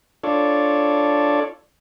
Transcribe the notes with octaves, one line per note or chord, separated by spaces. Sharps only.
D4 F4 A4 C#5 D5